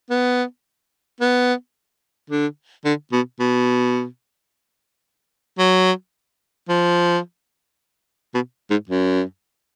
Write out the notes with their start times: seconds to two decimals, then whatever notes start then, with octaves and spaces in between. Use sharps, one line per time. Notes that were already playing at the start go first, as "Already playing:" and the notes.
0.10 B3
1.20 B3
2.30 D3
2.85 D3
3.12 B2
3.40 B2
5.59 F#3
6.69 F3
8.34 B2
8.70 G#2
8.89 F#2